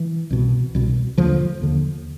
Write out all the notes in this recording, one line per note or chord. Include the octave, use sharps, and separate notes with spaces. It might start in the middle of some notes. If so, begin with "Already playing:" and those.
Already playing: E3
C2 B2
C2 B2
D#2 D3 F3
D#2 D3